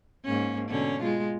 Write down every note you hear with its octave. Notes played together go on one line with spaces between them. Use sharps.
G#2 A#3 C#4
B2 D3 C#4
G#3 F4